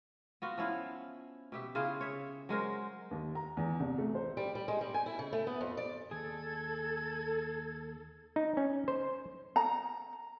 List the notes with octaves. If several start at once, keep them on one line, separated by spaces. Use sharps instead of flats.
B3 F4 F#4
F3 C#4 E4 F5
B2 G4 E5
C#3 E4 F4 G#4
C#5 E5
F#3 G#3 A#4 C5
D#2
A#5
E2
C2
A3
C5
G3
G3
G#3
G3
G#5
E4
C#3
A3
B3
F2
D5
D#2 G#4 A4 G#6
D#4
C#4
C5
A#5